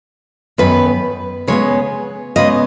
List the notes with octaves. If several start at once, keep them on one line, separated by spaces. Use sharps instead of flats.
F#2 D#3 B3 B4
C#3 G#3 B3 C#5
C#3 G#3 B3 D#5